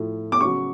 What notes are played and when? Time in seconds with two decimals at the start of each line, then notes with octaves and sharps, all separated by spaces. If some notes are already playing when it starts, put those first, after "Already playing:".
Already playing: A2 F3
0.32 D6
0.41 C#3 F#3 C#6